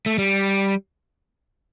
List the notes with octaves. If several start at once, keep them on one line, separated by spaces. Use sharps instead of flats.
A3
G3